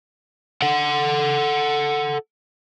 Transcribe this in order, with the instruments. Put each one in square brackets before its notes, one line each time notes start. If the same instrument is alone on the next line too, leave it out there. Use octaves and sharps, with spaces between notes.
[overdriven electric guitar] A4 F#5